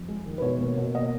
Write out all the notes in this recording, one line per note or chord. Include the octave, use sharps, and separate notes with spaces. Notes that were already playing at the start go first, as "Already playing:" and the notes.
Already playing: F2
G#3
D#3
B4
B2 C#5
A#3
B2
A#3 D#5